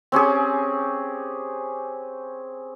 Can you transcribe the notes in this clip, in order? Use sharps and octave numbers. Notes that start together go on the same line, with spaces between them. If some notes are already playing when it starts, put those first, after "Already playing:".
C4 C#4 G4 G#4